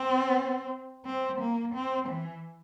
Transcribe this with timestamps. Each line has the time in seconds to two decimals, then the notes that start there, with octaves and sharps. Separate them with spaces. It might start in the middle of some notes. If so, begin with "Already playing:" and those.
Already playing: C4
1.06 C4
1.41 A#3
1.75 C4
2.09 E3